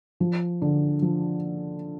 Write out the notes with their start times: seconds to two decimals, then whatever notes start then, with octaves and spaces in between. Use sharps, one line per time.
0.20 F3
0.62 D3
1.02 F3